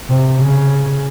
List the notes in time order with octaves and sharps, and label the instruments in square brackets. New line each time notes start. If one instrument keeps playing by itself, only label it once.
[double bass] C3
C#3